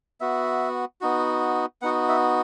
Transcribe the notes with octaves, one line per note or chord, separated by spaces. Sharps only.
B3 F#4 E5
B3 D#4 F#4
B3 D#4 F#4 F#5
E5